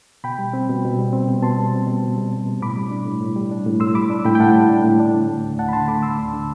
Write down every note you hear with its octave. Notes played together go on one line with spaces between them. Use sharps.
B2 G5 B5
G3
C4
B2
B2
G3
C4
B2
B2 A5 C6
G3
C4
B2
B2
G3
C4
B2
A2 B5 D6
G3
D4
A2
A2
G3
D4
A2
A2 C6 E6
G3 B5 D6
D4
A2 G5 B5
G5
A2 F#5 A5
G3
D4
A2
D4
D3
A3
D2
D4 F#5 A5
B5
D3 A5 C6
A3 B5 D6
D2 C6 E6
D4
D3